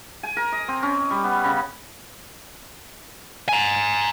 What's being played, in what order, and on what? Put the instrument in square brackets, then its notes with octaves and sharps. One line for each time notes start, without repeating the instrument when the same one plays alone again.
[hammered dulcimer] G#5
A#4
D#5
C4
C#4
G3
B3
C#3
[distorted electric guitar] G#5 A#5